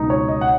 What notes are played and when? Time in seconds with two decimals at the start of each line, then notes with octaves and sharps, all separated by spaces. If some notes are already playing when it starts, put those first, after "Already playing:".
Already playing: C#2 B2 F#3 D#4
0.10 C#5
0.28 D#5
0.41 F#5